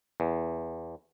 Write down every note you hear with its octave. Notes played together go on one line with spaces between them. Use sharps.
E2